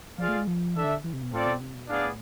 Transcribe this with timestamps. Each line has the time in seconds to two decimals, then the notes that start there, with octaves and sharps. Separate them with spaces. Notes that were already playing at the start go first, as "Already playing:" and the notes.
0.18 F3 F4 G#4 D5 F5
0.28 A3
0.37 G#3
0.47 F3
0.75 E3 D4 A4 E5
0.84 D3
1.04 E3
1.13 C3
1.22 B2
1.32 A2 C4 F4 A4 D5
1.46 B2
1.60 C3
1.75 B2
1.89 A2 B3 D4 G#4 D5 F5
2.04 A2